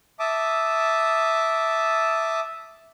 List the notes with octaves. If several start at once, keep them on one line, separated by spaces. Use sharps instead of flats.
E5 A5 D6 D#6